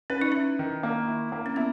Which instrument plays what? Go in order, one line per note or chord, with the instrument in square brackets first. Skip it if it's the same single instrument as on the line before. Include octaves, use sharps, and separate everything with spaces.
[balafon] C#4 [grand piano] B4
[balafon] D#4
[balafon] C#4 [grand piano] E4
[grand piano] D#3
A#3
E4
A#3
[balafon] C#4
[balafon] B3 [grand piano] E4